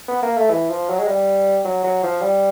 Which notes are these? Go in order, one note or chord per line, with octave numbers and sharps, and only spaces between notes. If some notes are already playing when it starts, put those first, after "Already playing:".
B3
A#3
A3
E3
F3
F#3
G#3
G3
F#3
F#3
F3
G3